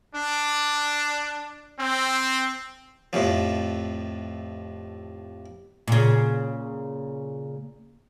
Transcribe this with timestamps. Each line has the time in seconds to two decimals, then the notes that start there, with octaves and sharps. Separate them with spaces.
0.15 D4
1.78 C4
3.13 F2 A2 C3 F3
5.88 A#2 C#3